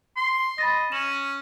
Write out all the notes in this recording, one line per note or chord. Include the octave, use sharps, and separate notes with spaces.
C6
D#5 B5 A6 A#6
C#4 E7 F#7